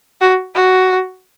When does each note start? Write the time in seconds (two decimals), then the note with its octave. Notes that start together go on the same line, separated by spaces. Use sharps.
0.21 F#4
0.55 F#4